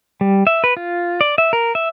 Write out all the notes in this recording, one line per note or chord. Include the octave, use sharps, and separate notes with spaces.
G3
E5
B4
F4
D5
E5
A#4
E5